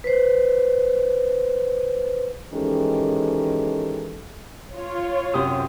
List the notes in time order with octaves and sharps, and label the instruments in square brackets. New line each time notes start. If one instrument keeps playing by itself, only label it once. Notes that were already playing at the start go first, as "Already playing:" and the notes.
[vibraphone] B4 C5
[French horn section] D#3 E3 G#3 C#4 G4 A4
[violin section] F4 C#5
[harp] F#2 C3 D#6